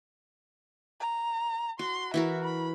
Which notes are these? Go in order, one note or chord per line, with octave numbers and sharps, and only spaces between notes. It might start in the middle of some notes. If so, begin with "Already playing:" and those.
A#5
F#4 C6
E3 F#4 A#4 E5
B5